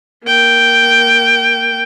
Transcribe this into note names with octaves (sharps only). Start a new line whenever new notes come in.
A#3 G5